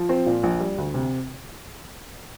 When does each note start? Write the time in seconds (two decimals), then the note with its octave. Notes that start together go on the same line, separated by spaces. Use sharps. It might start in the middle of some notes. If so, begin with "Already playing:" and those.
Already playing: F3
0.09 C4
0.26 A#2
0.43 A#1
0.60 G3
0.78 D2
0.94 C3